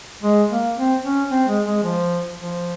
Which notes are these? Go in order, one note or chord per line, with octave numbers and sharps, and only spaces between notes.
G#3
A#3
C4
C#4
C4
G#3
G#3
F3
F3